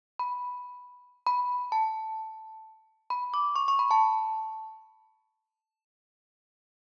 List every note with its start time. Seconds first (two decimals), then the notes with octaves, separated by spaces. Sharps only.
0.19 B5
1.27 B5
1.72 A5
3.10 B5
3.34 D6
3.56 C#6
3.68 C#6
3.79 B5
3.91 A5